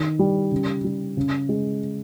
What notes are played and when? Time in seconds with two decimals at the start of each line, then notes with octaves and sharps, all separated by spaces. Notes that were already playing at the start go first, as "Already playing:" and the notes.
Already playing: D#3
0.19 G3
0.51 C#3
0.84 G3
1.17 C#3
1.49 G#3